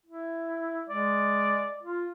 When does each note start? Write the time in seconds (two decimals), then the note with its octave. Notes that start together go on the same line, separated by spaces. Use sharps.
0.06 E4
0.89 G#3 D5
1.83 F4